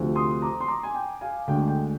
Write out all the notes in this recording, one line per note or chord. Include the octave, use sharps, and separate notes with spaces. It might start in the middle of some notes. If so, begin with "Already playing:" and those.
Already playing: D2 C3 F3 C4
C6 D#6
A#5 D6
C6
A#5 D6
G#5
G5
F5 G#5
D2 D3 G#3 G5
G5